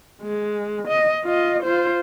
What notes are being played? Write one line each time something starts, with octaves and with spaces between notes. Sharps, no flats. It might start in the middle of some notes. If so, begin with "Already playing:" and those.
G#3
D#5
F4 D#5
F4 C5